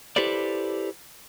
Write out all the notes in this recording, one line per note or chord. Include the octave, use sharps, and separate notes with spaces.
E4 G4 A4 B4 C5 D5